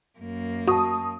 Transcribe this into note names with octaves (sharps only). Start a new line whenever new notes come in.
F#2 A#3
F#4 A5 C#6 D#6